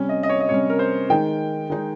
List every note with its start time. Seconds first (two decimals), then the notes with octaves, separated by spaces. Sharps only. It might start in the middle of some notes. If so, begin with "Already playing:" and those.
Already playing: C3 G3 C#4
0.09 D#5
0.23 D#5
0.29 C#5
0.40 D#5
0.49 C3 G3 C#4 C#5
0.70 A#4
0.79 C5
1.10 D#3 G#3 D#4 G5
1.70 D#3 G#3 D#4